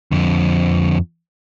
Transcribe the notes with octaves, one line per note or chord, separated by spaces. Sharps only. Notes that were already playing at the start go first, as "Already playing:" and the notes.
F2 D3